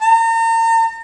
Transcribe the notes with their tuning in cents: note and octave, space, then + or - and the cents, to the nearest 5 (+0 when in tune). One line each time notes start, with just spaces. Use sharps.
A#5 -40